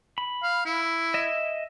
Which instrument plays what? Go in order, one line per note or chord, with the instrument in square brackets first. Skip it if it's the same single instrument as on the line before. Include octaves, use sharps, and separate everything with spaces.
[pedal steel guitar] B5
[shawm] F5
E4
[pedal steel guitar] D#5 E5